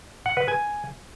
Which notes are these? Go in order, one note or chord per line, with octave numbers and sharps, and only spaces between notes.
F#5
B4
G#5